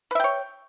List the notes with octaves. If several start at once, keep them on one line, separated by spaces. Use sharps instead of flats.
B4 C#5 E5 G5